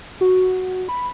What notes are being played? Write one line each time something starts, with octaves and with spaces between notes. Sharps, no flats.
F#4
B5